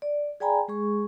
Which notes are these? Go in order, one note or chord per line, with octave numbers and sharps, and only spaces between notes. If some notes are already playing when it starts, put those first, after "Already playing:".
D5
G#4 D5 G5 G#5 A#5 B5
G#3 G#4 C#6